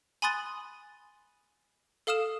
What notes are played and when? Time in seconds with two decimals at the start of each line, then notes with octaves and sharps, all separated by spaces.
0.22 G#5 B5 C6 D#6 F#6 A6
2.07 A4 F5 D#6 F6 E7